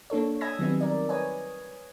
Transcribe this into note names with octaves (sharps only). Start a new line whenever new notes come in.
A#3 D4 A4 C#5
D#5 G#5 B5 E6 G#6 A#6
D#3 F#3 G3 B3 C4 D#4
A#4 D5
B4 C#5 D#5 G#5